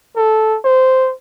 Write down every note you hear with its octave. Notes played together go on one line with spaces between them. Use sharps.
A4
C5